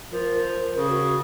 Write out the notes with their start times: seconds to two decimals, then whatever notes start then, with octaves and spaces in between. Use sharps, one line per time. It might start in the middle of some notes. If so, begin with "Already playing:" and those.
0.12 F3 A#4
0.74 C#3 A#4
0.89 F#4